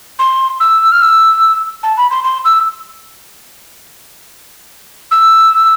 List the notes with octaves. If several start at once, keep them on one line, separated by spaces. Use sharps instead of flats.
C6
E6
F6
E6
A5
B5
C6
C6
E6
E6